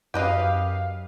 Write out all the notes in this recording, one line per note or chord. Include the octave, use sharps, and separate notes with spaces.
F#2 G4 B4 D#5 F5